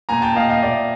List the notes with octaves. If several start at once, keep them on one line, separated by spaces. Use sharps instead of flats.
A#2 G#5 A#5
G5 A5
A#2 D#5 F5
D#5 F5
A#2 D5 E5